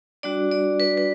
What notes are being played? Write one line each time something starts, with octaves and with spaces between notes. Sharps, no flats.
G3 D4 F#4 D5
D5
B4
B4